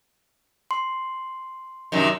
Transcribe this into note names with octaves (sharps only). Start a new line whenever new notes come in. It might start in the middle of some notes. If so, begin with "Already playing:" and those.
C6
F#2 C3 D#3